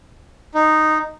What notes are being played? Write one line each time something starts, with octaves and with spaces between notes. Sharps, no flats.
D#4